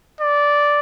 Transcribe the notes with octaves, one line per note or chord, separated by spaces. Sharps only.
D5